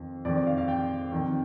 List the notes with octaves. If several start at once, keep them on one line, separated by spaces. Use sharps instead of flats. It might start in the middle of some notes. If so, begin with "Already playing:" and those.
Already playing: F2 D#3
F2 D#3 D5
D5
F5
F5
G5
F2 D#3